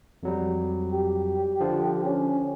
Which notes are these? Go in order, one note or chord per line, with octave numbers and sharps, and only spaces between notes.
F2 F#3 G3
G4
D3 F3
C#4